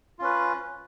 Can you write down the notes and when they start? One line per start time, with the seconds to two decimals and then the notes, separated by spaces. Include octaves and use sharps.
0.19 F4
0.21 C#4
0.24 B4